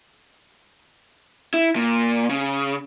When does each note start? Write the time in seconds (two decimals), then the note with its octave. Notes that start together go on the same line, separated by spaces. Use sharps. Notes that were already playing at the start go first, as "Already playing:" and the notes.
1.54 E4
1.76 A#2
2.30 C#3